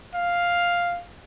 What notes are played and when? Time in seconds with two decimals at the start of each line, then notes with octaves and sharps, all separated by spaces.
0.15 F5